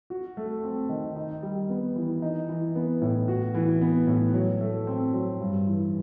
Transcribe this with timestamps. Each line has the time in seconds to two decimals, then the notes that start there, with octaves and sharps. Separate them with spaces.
0.10 F#4
0.37 A3
0.63 C4
0.89 D#3
1.16 D#4
1.43 G3
1.69 B3
1.96 E3
2.22 D#4
2.49 E3
2.75 B3
3.02 A2
3.28 F#4
3.54 E3
3.81 B3
4.07 A2
4.34 F#3
4.61 A3
4.87 C4
5.14 F#3
5.40 G2
5.66 E3